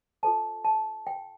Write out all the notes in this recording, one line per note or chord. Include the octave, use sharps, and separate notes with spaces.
F4 A4 C5 A5
A5
G5